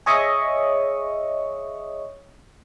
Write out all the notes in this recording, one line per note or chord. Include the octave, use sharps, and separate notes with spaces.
G#4 C#5 D#5 E5 C#6 D#6